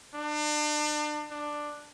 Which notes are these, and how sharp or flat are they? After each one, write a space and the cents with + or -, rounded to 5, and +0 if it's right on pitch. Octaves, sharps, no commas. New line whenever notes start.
D4 +35
D4 +10